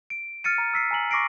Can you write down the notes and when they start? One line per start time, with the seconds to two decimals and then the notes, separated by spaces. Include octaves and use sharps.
0.10 D7
0.44 F6 A6 C#7 D#7
0.58 A#5
0.74 E6 B6 C7
0.91 G#5 A#5 F#7
1.11 C#6 D6 A#6 C7 D7